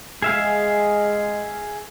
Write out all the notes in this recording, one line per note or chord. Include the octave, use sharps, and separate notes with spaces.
G#3 G#4 E5 F5